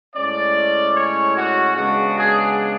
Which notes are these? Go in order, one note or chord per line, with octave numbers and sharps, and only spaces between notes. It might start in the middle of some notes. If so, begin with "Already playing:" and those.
A2 G#3 C#4 D5
C#5
F#4
C#3 G#3 B3 D4 F#4
G#4